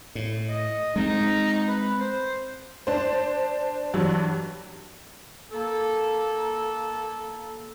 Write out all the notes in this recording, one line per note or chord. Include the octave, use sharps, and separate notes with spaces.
A2
D#5
G#3 A3 C4 D#4
B4
C5
D4 C5
G2 E3 F#3
A#3 A4